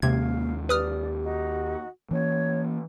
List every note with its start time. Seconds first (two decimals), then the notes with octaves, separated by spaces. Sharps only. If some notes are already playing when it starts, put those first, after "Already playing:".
0.02 D#2 C3 G#3 A#3 C#4 F5 G#6
0.69 G4 B4 D5 D#6 F6
1.23 D#4 F#4
2.11 E3 A#3 C#4 C#5